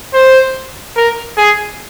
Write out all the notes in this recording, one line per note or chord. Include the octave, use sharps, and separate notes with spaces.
C5
A#4
G#4